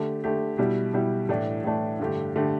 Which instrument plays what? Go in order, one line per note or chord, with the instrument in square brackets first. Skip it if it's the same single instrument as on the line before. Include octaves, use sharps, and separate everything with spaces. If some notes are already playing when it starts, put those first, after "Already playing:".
Already playing: [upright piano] D3 A3 G4
D3 A3 G4
B2 G3 E4 G4
B2 G3 E4 G4
A2 E3 A3 D4
A2 E3 A3 D4
G2 D3 A3 G4
D3 A3 G4